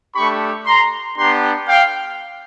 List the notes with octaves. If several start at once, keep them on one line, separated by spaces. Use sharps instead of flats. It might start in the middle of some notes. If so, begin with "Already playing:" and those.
A3 D4 G4 B5 C#6
A#5 C6
B3 D4 G4 A#5 C6
F5 G5